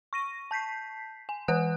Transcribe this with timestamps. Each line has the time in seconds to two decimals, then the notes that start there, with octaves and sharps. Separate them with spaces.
0.13 C#6 A#6 D#7
0.51 A5 G6 B6 C7
1.29 G#5
1.48 E3 B4 F#5 G#5 D#6 F#6